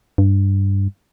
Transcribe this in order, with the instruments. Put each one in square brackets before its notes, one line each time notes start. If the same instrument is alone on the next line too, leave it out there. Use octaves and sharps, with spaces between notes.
[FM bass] G2